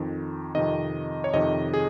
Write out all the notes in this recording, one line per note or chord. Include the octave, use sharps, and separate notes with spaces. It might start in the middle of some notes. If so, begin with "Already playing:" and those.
Already playing: F2 D#3
F2 C3 D#3 D#5
C#5
F2 C3 D#3 D#5
G#4